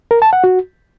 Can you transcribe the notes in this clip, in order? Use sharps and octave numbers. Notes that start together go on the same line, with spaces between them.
A#4
A5
F#5
F#4